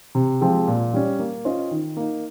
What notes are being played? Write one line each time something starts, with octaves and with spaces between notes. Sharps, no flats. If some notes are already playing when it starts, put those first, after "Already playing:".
C3
F3 G#3 C4 G4
A#2
G3 C#4
A#3
C#4 F4 C5 D#5
D#3
A#3 D#4